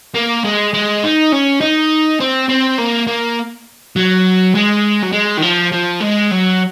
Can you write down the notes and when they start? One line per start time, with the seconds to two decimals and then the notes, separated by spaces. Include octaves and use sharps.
0.15 A#3
0.44 G#3
0.74 G#3
1.03 D#4
1.32 C#4
1.61 D#4
2.20 C4
2.49 C4
2.78 A#3
3.08 A#3
3.96 F#3
4.55 G#3
5.03 F#3
5.13 G#3
5.38 D#3
5.42 F3
5.72 F3
6.01 G#3
6.31 F#3